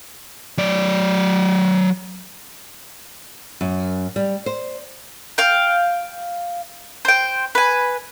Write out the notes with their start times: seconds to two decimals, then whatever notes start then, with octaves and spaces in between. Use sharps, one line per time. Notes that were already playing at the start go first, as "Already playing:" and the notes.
0.58 F#3 D5
3.61 F#2
4.16 G3
4.46 C5
5.38 F5 G5
7.05 C5 G5
7.55 B4 G#5